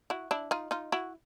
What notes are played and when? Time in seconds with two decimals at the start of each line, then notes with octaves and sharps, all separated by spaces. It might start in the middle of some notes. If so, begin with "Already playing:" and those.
0.10 E4 F#4
0.31 D4 E4
0.51 D#4 F4
0.71 D#4 F4
0.92 E4 F#4